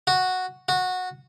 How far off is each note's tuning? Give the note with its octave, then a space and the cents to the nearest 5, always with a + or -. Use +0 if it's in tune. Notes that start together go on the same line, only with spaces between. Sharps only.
F#4 -5
F#4 -15